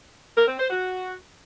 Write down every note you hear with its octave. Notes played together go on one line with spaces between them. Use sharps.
A#4
C4
C5
F#4